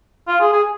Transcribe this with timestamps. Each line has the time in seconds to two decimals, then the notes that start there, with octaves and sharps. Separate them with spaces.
0.28 F4
0.40 G#4
0.53 G#4